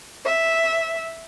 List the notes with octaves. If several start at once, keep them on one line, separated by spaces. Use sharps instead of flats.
E5